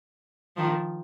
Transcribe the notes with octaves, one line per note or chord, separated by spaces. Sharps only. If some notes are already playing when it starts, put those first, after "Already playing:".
D#3 F3